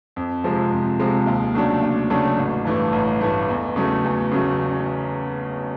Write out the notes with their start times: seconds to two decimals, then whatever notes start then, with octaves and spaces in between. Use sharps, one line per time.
0.16 F2
0.44 C3 F3 G#3
0.72 F2
0.99 C3 F3 G#3
1.27 D#2
1.55 C#3 F#3 A3 D4
1.83 D#2
2.10 C#3 F#3 A3 D4
2.38 A1
2.65 G2 E3 A3
2.93 A1
3.21 G2 E3 A3
3.49 E2
3.76 C#3 F#3 A3
4.04 E2
4.31 C#3 F#3 A3